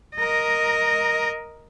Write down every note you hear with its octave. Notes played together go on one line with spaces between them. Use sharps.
A#4 D#5